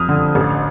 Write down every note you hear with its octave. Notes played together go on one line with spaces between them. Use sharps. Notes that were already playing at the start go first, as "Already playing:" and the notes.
Already playing: F2 D#6 F6
D3
A1